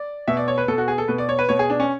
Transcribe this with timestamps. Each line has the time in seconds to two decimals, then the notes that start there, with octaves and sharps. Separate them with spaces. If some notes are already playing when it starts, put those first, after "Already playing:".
Already playing: D5
0.28 B2 E5
0.37 D5
0.48 C#5
0.58 B4
0.68 B2 A4
0.78 F#4
0.88 G#4
0.98 A4
1.08 B2 B4
1.18 D5
1.29 C#5
1.39 B4
1.49 B2 C#5
1.59 G#4
1.70 D4
1.80 C#4